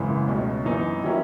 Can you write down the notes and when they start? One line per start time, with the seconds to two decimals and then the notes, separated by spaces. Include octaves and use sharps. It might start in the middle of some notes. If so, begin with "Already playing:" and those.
Already playing: G#1 F#2 C#3 E3 G#3
0.28 C#2 B2 A3 C#4
0.65 F#2 E3 B3 D#4
1.03 D#3 F#3 C#4 E4